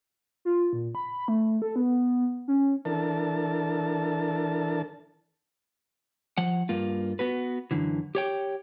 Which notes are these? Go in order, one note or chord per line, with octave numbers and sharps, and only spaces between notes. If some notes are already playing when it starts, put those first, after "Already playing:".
F4
A#2
B5
A3
A4
B3
C#4
E3 D4 A4 A#4 A5
F3 F#5
G2 A#3 F4
B3 F#4 B4
F#2 D3 E3
G4 C#5 G5